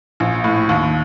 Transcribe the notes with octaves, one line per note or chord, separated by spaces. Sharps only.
A#1
A2
D#2